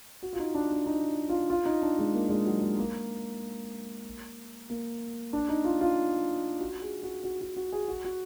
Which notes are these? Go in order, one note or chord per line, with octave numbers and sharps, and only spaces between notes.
F#4
F4
D#4
D4
D4
D#4
F4
F4
D#4
D4
G#3
A#3
G#3
F#3
G#3
A#3
A#3
D4
D#4
F4
F4
F#4
G#4
F#4
F#4
F#4
F#4
G#4
F#4
F#4